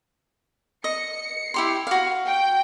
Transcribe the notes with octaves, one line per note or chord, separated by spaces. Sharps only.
D#5 C#7
E4 G4 C6
F#4 F5
G5